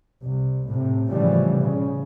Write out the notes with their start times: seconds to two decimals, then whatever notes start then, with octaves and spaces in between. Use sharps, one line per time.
0.22 C2
0.67 A2 C3
1.11 A2 C#3 E3 F3 G3
1.60 C#3